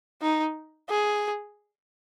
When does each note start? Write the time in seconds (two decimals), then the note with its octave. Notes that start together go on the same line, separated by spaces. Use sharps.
0.22 D#4
0.89 G#4